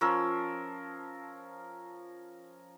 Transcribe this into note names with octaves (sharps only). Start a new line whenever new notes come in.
F3 C#4 A#4 E6